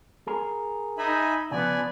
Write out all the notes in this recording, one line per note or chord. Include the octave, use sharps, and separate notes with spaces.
G#4 A#4
D#4 E5 G#5 B5
C#3 F3 B3 D5 G#5